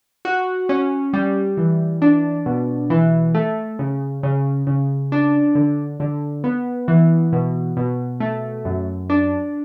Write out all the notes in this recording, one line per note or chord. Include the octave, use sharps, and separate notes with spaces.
F#4
C#4
G3
E3
D4
B2
E3
A3
C#3
C#3
C#3
D4
D3
D3
B3
E3
B2
B2
A3
F#2
D4